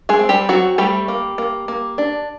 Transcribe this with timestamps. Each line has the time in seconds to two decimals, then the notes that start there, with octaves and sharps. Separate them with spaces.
0.09 G#3 G#4
0.19 C4
0.29 G3 G4
0.49 F#3 C4 F#4
0.78 G3 A3 G4
1.08 A#3
1.38 A#3
1.68 A#3
1.98 D4